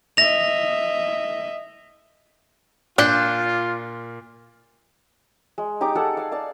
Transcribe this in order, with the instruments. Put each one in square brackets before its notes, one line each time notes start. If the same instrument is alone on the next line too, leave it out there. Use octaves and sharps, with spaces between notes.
[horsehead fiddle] D#5 E5 [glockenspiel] A#6 F7
[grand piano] A#2 [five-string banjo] D4 [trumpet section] F4 [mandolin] F#6 G6
[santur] G#3
D#4 G4 A#5 D6
G#4 A4 F#5 A5
F5
D5 F5 A5